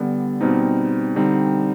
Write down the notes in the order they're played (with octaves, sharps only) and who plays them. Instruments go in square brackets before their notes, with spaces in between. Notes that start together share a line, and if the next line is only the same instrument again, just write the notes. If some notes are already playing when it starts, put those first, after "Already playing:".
Already playing: [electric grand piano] D3 G3 B3
B2 G3 C4 D#4
D3 G3 C4 D#4